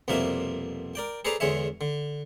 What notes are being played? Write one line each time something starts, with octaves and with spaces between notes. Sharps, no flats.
C2 F2 B2 A#3 D4 E5
A#4 D5 G5
G#4 A4 B4 C5 D5 A#5
E2 D3 G#3 C#5 E5
D3